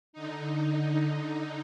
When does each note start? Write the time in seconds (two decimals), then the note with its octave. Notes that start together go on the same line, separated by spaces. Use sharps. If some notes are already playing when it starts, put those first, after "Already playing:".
0.13 D3 D#4